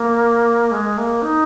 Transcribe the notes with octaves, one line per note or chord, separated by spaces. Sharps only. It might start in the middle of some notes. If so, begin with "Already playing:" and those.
Already playing: A#3
G#3
A#3
D#4